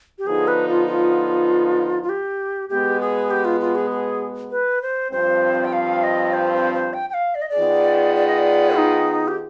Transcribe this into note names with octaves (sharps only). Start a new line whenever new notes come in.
G4
D3 F3 B3 D#4 G#4
B4
F4
F4
F4
G4
B2 G#3 B3 G4
G#4
G4
F4
F4
G#4
G#4
B4
C5
G2 F3 C4 C5
G5
F5
D#5
C5
C5
C5
G5
G5
F5
D5
D#5
D5
D#3 B3 F4 G#4
D5
D#5
D5
D#4
G4